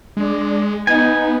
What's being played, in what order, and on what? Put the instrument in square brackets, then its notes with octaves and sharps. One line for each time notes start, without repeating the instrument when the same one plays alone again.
[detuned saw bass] G#3 [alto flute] D4
[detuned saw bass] B3 [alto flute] D#4 [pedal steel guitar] G#5